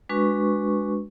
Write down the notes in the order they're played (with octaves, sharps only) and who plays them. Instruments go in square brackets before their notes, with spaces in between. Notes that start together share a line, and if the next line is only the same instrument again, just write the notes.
[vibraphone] G#3 D4 F#4 B4 C#6